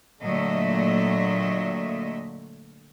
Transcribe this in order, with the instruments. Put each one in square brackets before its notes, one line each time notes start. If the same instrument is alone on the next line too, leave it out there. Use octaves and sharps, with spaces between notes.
[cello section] A#2 D3 F#3 A3 D#5 E5